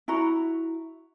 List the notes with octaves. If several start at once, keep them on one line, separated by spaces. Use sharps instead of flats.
E4 F#4 A#5